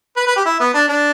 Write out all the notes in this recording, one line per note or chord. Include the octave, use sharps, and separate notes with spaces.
B4
B4
G4
E4
B3
D4
D4